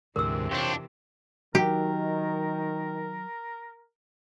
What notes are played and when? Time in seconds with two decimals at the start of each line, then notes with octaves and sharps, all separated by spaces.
0.16 D2 G#2 C3 E3 A#4 E6
0.51 F2 D4 C5 C#5 G5
1.55 D#3 F#3 G4 A#4